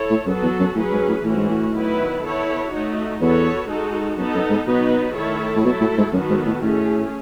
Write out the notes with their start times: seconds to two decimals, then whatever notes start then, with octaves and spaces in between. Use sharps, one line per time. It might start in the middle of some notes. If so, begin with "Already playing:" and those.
Already playing: E4 A4 C#5
0.10 A2
0.27 F#2 F#3 B3 F#4 A4
0.43 E2
0.60 F#2
0.76 A2 F#3 C#4 G#4 B4
0.92 G#2
1.08 A2
1.24 A2 E3 A3 C#4 F#4
1.37 G#2
1.50 A2
1.73 D#3 F#3 B3 E4 B4
2.22 B3 E4 A4 C#5
2.71 A3 D#4 F#4
3.20 E2 B3 F#4 A4 C#5
3.69 G#3 D#4 F#4 A4
4.18 F#2 B3 D#4 A4
4.34 F#2
4.50 G#2
4.67 B2 F#3 B3 D#4 F#4 B4
5.15 D#3 A3 E4 A4 C#5
5.56 A2
5.64 B2 F#3 A3 E4 A4
5.80 A2
5.97 G#2
6.13 F#2 D#3 F#3 B3 F#4 A4
6.30 G#2
6.46 A2
6.62 A2 A3 C#4 G#4